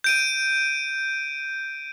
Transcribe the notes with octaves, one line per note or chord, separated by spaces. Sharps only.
G6 D7 D#7